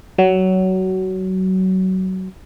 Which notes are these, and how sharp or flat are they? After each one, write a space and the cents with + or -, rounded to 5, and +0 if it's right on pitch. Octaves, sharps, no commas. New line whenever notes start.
F#3 +20